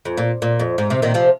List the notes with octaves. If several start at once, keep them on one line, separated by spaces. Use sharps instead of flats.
F2
A#2
A#2
F2
G#2
C3
A#2 D#3
C3 F3